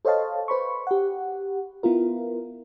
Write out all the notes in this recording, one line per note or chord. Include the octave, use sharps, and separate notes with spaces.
A4 C5 C#5 D#5 F5 A5
B4 C5 B5 C#6
G4 F#5
B3 E4 F4 A#4